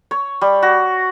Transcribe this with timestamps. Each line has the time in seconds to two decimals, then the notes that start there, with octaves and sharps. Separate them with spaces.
0.11 C#5
0.41 G3
0.62 F#4